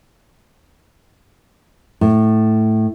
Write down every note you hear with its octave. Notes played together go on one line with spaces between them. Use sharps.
A2